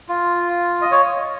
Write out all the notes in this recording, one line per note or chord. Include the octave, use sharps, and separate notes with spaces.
F4
D#5
C#5